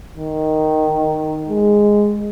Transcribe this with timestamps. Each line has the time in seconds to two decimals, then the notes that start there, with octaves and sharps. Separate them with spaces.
0.17 D#3
1.49 G#3